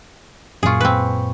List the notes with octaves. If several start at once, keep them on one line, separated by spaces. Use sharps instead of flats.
F#2 A#2 F4 G#4 C#6
C4 B4